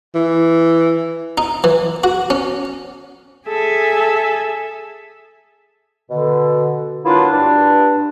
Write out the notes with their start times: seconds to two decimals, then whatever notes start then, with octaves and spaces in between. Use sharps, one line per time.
0.15 E3
1.38 D#4
1.64 E3
2.04 F#4
2.30 C#4
3.47 G#4 A4 E5 G#5
6.10 B2 D3
7.04 F#3 A#3 B3 D4 E4 F4
7.31 G2 D4